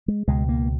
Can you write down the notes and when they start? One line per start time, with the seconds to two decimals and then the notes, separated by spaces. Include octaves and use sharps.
0.08 G#3
0.27 C#2 B2 G#3
0.49 A#3